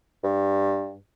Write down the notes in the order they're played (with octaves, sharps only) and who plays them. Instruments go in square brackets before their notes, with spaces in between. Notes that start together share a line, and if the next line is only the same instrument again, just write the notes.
[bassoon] G2